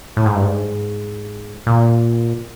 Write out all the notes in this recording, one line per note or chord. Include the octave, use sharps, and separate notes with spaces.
A2
G#2
G2
G#2
A#2